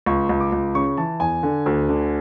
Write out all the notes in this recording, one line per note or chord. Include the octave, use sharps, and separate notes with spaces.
C#2 C#6
C#2
D6
C#2
C#3 C#6
E3 A5
E2 G#5
D3
D2
D3